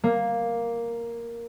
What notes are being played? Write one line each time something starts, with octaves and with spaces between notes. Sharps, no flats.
A#3